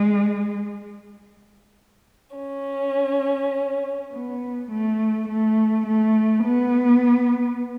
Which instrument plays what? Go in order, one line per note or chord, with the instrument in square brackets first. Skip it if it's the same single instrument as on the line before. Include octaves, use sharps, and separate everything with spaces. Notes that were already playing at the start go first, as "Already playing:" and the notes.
Already playing: [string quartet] G#3
C#4
B3
A3
A3
A3
B3